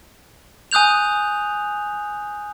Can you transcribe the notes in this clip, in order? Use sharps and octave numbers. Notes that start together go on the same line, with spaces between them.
G#5 D#6 F#6 G6 F7